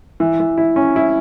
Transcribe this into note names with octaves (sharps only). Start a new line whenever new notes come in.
E3
E3
E4
C#4
E4